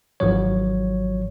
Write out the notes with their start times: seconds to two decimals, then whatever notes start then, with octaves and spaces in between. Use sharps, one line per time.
0.20 G#1 G#2 F3 F#3 C#5